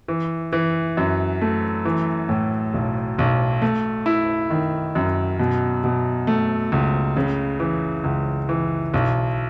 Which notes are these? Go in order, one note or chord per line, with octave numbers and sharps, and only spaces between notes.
E3
E3
F#2
A3
E3
A2
B1
B1
A3
E4
D#3
F#2
B2
B2
A3
C#2
C#3
E3
C#2
E3
B1